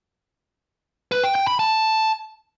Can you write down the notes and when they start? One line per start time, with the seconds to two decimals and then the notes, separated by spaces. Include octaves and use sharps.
1.12 B4
1.24 G5
1.35 G5
1.47 B5
1.59 A5